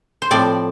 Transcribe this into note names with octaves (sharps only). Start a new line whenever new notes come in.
C5
A2 F3 C4 D5